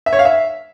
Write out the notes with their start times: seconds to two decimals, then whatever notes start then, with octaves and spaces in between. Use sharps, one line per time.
0.06 E5
0.13 C#5
0.19 F5
0.25 E5